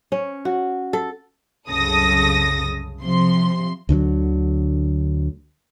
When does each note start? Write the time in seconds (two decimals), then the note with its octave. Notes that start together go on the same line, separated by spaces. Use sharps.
0.12 C#4
0.45 F#4
0.93 A4
1.68 C2 F#2 C#3 A4 D#6 A#6
3.03 C3 F3 C6
3.89 D2 D3 D#3 F#3